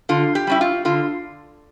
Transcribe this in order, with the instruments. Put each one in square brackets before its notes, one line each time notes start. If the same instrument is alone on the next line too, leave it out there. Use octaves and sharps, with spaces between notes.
[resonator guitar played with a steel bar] D3 F4
G4
G3 C#4 E4
F4
D3 F4